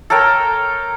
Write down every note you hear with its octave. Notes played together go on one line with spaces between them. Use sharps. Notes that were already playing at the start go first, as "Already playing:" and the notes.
A4 A#4 C#5 G5